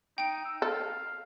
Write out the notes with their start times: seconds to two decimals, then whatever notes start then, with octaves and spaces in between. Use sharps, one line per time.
0.18 D#4 G5 D7
0.45 E6
0.62 A4 F5